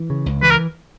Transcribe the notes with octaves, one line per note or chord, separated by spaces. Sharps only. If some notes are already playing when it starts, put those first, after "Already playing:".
Already playing: E3
C#3
C#2
E3 B4
A#4